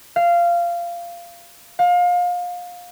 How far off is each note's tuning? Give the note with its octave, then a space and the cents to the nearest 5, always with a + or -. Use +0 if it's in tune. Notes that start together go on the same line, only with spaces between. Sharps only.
F5 -15
F5 +30